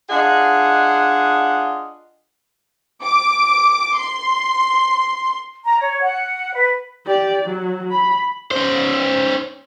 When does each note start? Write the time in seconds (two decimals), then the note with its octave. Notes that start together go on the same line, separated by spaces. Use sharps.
0.10 D4 F4 G#4 D#5 F#5
3.04 D6
3.96 C6
5.65 A#5
5.80 C#5
6.01 F#5
6.55 B4
7.06 G4 D5
7.46 F#3
7.91 B5
8.51 C#4 C5